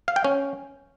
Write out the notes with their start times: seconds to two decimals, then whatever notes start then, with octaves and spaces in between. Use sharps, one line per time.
0.08 F5
0.16 G5
0.24 C#4